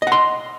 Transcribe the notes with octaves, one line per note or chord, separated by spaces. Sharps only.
D#5 F#5 C6